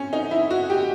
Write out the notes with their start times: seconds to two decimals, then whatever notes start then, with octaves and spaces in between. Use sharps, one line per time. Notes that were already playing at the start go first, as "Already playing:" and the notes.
Already playing: C4 C#4
0.13 D#4
0.31 E4
0.51 F#4
0.70 G4